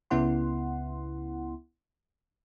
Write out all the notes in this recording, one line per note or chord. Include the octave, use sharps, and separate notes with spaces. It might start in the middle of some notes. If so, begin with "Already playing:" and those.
C#2 C#3 B3 E4 F#5 C6